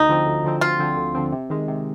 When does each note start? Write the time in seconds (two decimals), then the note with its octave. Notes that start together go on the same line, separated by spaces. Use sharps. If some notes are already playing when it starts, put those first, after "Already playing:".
Already playing: D2 D#4
0.09 D3 F3 C4
0.26 D2
0.44 D3 F3 C4
0.61 D2 F4
0.79 D3 F3 C4
0.97 D2
1.15 D3 F3 C4
1.32 C3
1.50 D#3 G#3
1.68 C3